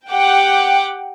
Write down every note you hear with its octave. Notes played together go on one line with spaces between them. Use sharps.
G4 F#5 G5 D6